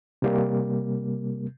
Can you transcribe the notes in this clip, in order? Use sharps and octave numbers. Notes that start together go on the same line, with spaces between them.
C3 G3 A#3